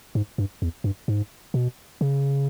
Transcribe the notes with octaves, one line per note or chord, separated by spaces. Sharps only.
G#2
G2
E2
G2
G#2
B2
C#3